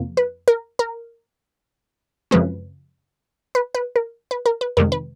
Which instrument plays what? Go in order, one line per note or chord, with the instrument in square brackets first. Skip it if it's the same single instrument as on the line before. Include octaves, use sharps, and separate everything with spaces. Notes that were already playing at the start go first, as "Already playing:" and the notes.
Already playing: [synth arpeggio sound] F2 C3 A#3
B4
A#4
A#4
F#2 C#3 F3 G#3 C4 B4
B4
B4
A#4
B4
A#4
B4
F2 C3 D#3 G#3 A#4
B4